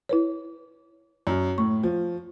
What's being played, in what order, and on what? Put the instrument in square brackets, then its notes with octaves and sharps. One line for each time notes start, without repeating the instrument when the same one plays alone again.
[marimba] E4 B4 C#5
[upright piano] F#2
[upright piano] A2 [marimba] C#6
[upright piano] F3